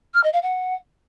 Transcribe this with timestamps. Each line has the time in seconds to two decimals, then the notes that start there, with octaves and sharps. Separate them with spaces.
0.14 F6
0.24 D#5
0.33 F5
0.43 F#5